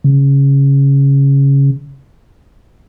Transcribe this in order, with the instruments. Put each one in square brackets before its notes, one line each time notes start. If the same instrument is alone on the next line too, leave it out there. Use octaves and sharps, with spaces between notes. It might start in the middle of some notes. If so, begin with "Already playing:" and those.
[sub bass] C#3